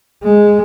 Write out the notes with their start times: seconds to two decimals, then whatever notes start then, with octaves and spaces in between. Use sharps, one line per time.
0.24 G#3